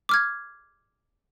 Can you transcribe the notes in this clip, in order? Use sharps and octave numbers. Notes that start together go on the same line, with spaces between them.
D6 F6 G#6